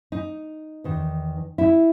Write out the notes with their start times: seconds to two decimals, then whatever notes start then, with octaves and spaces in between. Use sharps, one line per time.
0.12 D#4
0.84 E2 D#3
1.58 E4